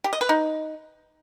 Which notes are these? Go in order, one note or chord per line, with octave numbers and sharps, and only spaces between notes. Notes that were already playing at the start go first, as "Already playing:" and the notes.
G4
D#5
B4
D#4